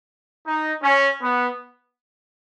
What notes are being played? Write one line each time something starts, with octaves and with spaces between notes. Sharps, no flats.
D#4
C#4
B3